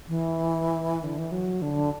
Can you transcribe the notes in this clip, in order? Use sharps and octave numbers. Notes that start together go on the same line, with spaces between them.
E3
D3
E3
F#3
D3